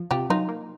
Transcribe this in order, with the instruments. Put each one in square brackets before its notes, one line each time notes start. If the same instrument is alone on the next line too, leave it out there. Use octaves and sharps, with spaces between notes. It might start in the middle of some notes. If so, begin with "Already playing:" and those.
Already playing: [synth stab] F3
[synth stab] C3 [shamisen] F4 G4
[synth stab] F#3 [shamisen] D#4 F4
[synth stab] A#3